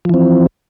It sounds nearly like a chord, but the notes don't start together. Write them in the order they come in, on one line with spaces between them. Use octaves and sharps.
F3 E3 C4